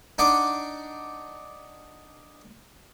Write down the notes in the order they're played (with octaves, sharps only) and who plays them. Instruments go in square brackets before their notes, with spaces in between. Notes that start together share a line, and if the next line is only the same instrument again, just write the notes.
[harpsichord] D4 D#4 F#5 D6